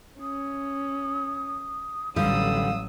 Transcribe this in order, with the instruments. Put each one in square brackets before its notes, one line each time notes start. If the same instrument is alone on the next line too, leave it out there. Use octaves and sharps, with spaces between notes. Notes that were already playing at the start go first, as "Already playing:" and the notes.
[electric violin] C#4 [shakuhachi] D#6
[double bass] A1 F#3 [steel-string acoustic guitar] D3 G3 [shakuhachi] F5 [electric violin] D#6 E6